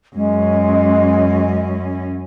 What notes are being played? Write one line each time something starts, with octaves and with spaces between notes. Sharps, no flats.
F#2 G#3 C#4